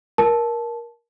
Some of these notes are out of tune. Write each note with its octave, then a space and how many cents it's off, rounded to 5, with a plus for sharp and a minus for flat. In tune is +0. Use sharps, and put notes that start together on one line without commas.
A#4 +15 A5 -15